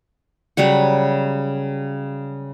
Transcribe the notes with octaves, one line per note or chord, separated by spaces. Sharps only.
C#3 F#3 G3 F#5